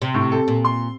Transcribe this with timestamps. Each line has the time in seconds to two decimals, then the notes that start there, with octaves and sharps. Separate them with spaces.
0.02 C3
0.14 A2
0.32 A4
0.48 A#2
0.65 C6